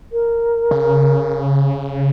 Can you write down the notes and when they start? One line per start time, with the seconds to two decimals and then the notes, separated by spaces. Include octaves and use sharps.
0.12 A#4
0.71 C#3